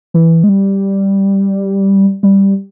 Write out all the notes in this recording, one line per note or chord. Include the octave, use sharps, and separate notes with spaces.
E3
G#3
G3
G3